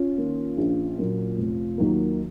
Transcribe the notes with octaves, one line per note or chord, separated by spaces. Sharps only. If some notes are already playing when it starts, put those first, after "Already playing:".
Already playing: C#4 F4
D#3 A#3
A#1
A#2 F#3 A#3
F1
D#2 D#3 F#3 A#3